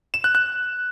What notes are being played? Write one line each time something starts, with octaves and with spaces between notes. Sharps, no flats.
E7
F#6
F#6